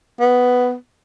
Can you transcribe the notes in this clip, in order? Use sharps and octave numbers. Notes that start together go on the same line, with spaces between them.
B3